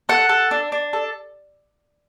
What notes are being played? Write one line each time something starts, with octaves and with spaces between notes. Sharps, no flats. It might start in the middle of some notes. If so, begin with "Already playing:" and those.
A4 F#5
A4
D4
D4
A4